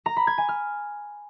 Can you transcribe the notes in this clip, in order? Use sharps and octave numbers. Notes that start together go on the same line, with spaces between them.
A#5
B5
G#6
G#5
F6